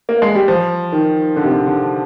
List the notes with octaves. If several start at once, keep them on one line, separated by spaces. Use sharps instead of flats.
A#3
G#3
G3
F3
D#3
D3
C3
D3
D3